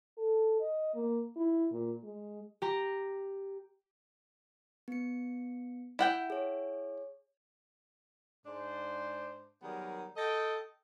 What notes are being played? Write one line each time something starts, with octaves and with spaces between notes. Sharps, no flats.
A4
D#5
A#3
E4
A#2
G#3
G4 A#5
B3 C#7
E4 F#5 G5
G#4 C#5
G#2 D4 C5
D#3 F#3 G3 B3 G#4 A#4
A4 D#5 G5